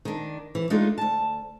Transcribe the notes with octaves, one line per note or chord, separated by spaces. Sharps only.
D#3 D4
E3
G#3 A3 D4 D#4 F4
D2 A5